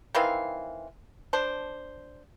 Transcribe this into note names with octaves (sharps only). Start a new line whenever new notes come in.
D#3 E3 C4 F5
D4 C5